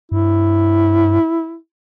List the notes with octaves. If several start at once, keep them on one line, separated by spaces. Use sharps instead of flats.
G2 E4